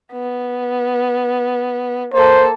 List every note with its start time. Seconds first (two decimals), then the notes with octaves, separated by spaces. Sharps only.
0.12 B3
2.13 A#3 A4 C5